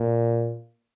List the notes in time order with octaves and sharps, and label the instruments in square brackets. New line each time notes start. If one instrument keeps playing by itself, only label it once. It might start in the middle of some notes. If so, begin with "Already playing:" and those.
Already playing: [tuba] A#2